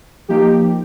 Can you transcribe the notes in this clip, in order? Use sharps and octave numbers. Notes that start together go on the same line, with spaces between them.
F3 A#3 D#4 G4